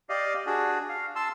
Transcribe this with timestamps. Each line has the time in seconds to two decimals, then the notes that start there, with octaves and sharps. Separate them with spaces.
0.09 G4 D5 D#5 F5
0.46 D4 F#4 G#4
0.89 F5
1.16 A5 C6 E6